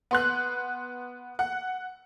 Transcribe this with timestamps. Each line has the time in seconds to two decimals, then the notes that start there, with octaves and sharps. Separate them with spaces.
0.11 B3 C6 F#6
1.39 F#5